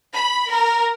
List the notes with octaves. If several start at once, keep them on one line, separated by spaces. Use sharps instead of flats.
B5
A#4